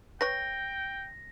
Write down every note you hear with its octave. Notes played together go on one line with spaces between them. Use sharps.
B4 C#5 G5 A#6